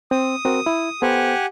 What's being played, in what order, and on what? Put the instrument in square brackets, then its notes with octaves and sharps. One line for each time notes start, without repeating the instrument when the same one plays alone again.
[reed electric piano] C4 [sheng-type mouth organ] D#6
[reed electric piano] C4 F#4 A#4
E4
[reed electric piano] B3 A4 C5 [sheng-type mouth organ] G4 F#5 G#5